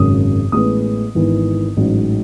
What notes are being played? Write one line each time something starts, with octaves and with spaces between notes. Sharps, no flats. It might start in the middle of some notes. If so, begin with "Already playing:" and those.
Already playing: G#1 F#2 C#3 G#3 D#6
A1 A2 G#3 B3 D#6
G#1 G#2 E3 B3
A1 G#2 F#3